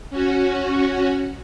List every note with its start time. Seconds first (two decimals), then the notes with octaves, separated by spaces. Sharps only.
0.10 C#4 F#4